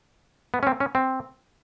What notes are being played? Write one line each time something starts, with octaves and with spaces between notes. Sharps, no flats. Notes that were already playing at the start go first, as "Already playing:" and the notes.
B3
C#4
C4
C#4
C4